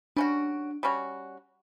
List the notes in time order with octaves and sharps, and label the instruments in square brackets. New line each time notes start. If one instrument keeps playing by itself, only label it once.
[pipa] G3 C#4 F#4 [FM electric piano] D4
[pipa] G3 C#4 F#4